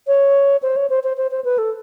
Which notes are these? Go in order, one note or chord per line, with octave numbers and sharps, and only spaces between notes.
C#5
C5
C#5
C5
C5
C5
C5
B4
A4